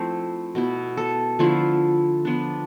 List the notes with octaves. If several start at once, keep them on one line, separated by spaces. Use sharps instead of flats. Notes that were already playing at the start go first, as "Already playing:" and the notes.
Already playing: F3 A3 C4 E4 C5
B2 B3 E4
A4
D3 F3 A3 E4 F4
F3 B3 D4